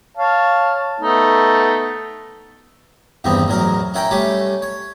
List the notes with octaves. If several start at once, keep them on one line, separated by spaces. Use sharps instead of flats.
C#5 F5 A5
A3 B3 D#4
E2 G2 D#3 B3 C4
A1 E2 F#3 A#4
C#4 E4 A#4 F#5 G5
G3 A3 C#4 G4
C#5